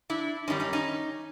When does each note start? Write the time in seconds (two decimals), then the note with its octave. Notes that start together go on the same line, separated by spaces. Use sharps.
0.10 D4 E4
0.48 F#2 D#3 G3 C#4 D#4
0.60 C#4 D#4
0.73 C#4 D#4